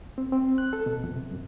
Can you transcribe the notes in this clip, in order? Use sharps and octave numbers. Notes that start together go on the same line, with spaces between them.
C4
C4
F#6
A4
B2
F2
C3
F#2